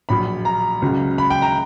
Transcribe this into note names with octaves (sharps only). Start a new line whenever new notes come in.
A#1 A#2 F#3 B5
A#5
C#2 C#3 F#3
B5
G5
A#5